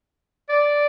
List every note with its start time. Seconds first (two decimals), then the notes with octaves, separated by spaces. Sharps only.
0.49 D5